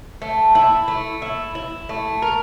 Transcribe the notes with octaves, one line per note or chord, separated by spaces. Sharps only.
A3
E4
A3
E4
E4
A3
A#4